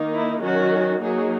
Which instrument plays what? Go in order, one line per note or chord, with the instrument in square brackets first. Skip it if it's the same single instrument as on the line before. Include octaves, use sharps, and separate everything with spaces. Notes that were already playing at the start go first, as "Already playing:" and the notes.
Already playing: [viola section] D#3 A#3 D#4
E4
D#3 F#3 C#4 F#4
F#3 A#3 D#4 G#4